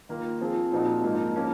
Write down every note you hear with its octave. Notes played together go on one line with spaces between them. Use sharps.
D#3 A#3 F4
F3 C4 F4 G#4
A#2 F3 C4 D#4 F#4
G#2 F3 A#3 D#4
F3 A#3 C#4